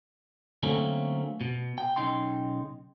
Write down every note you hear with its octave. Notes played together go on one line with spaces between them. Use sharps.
D3 F#3 A3 A#3 C4 C#4
B2
G5
B1 F2 C#3 D#4 G5 C6